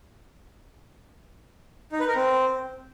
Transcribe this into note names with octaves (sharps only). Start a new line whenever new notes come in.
D#4
B4
A#4
C4